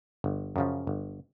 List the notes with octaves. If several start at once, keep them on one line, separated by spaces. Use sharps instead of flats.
G1
F#2 C#3 F3
G1